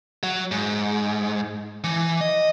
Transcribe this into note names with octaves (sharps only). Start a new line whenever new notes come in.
F#3
G#2
E3
D#5